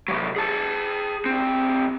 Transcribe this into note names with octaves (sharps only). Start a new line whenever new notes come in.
C3 F#3
G#4 A5
B1 C4